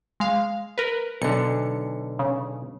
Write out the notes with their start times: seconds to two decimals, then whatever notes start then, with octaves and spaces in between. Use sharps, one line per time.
0.20 G#3 F5
0.78 A#4 B4
1.22 B1 D3 C#7
2.19 C#3